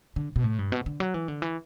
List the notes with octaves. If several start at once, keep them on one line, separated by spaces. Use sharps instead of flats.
D3
B2
A2
G2
B2
D3
F#3
E3
D3
E3